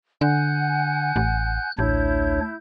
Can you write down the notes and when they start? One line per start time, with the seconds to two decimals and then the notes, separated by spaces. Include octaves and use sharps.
0.21 D3 F#5 G#5 F#6 G6
1.16 A1
1.79 A1 D2 D4 E4 C#5 G6